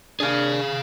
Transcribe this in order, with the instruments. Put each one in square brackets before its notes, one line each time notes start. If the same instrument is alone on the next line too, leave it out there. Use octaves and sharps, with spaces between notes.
[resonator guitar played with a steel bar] A#3 D4 [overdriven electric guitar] G#4 F5